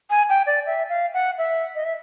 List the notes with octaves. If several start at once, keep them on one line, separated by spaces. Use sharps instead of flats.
G#5
G5
D5
E5
F5
F#5
E5
D#5
E5